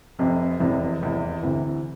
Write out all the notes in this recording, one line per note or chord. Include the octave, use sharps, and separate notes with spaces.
F1 F2 C3
F1 E2 C3 E3
F1 E2 C3 E3
D2 C3 E3